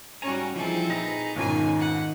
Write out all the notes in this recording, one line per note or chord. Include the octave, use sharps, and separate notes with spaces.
G#2 G3 C#4 F#4 G#5 A#5
E3 F3 G3 C4 D#4 E4 G#4 A4
A#2 D#4 B4 A#5 A#6
B1 F2 G#2 D#3 C#4 G#5
F#5